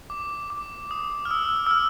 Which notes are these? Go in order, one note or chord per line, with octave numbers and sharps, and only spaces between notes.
D6
D6
D#6
F6
E6
E6
F6